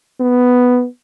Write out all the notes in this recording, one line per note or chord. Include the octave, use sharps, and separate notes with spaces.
B3